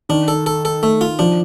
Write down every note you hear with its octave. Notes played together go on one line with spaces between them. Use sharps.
D#3 D4
A4
A4
A4
A3
F4
F3 D4